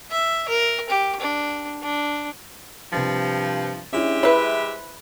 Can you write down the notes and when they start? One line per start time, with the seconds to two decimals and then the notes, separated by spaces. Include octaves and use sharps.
0.11 E5
0.49 A#4
0.90 G4
1.21 D4
1.83 D4
2.93 G2 C3 F3 A6
3.92 G#3 C#4 D4 E4 G4 E5
4.23 E4 B4 C5